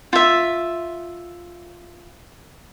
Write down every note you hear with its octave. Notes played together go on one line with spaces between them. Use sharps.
F4 E5